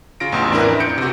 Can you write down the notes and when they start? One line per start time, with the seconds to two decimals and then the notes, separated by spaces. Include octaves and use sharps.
0.20 C#3 F4 A#6 D7
0.32 A1 E2 C6
0.52 D4 E4 A#4 B4
0.65 F2
0.80 G6 C#7 D7
0.98 C3 F#4